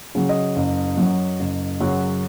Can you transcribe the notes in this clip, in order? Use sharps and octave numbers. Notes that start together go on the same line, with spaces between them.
C#3 F#3
D#5
F#1
F#2 F#3
F#1
F#2 C#3 F#3